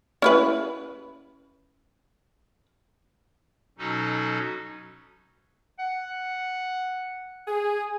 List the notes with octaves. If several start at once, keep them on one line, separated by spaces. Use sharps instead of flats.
C#4 E4 B4
B2 F#3 C#4 D#4 F#4 A4
F#5
G#4